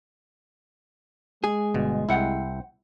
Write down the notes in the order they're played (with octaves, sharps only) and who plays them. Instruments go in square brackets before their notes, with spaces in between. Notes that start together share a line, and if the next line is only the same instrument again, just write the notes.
[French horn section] G#3 [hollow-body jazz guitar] G#4
[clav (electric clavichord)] G1 B2
[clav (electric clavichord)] C2 E4 [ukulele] C5 F#5 G5